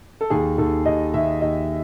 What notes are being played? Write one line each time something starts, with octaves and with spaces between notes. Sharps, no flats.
A4
D#2 G#4
D#2 A4
D#2 D#5
D#2 E5
D#2 D#5